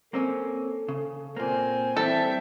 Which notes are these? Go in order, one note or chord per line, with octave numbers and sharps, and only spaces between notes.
A#3 C4 C#4 A4
C#3
A#2 A#3 C4 G#5
E3 G3 C4 G4 A4 E5